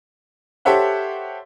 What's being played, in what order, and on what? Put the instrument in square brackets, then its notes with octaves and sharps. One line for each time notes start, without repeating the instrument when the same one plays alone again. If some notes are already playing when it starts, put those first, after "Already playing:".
[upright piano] G4 A4 C5 C#5 E5 F#5